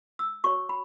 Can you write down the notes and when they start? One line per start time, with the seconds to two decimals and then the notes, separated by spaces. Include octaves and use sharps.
0.19 E6
0.44 F#4 C#5 C#6
0.69 B5